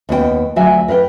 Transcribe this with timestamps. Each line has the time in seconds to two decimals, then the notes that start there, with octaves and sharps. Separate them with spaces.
0.09 D#2 B3 F4 G5
0.56 D2 F#3 E5 G#5
0.88 A#4 B4 F5 G5